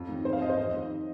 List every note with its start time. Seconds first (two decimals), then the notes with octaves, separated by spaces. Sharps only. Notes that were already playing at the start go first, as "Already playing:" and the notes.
Already playing: F2
0.09 D#3
0.25 F2 C5
0.33 F5
0.41 F2 D#5
0.50 C5
0.57 F2 D#5
0.74 D#3